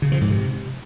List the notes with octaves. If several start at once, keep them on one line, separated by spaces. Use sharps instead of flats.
C#3
F3
G#2
C3